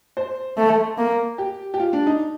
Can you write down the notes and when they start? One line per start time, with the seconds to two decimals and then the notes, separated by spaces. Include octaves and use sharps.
0.17 C5
0.57 A3
0.98 A#3
1.38 G4
1.74 G4
1.80 F4
1.93 D4
2.07 D#4